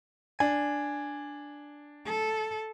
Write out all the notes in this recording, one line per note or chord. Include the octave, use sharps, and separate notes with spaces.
D4 G#5
A4